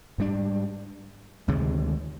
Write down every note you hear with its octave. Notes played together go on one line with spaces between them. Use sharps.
G#2 G3 D4
D2 C3 D#3 G#3